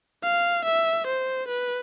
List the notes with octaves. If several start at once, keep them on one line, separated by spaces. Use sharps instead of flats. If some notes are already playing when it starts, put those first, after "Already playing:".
F5
E5
C5
B4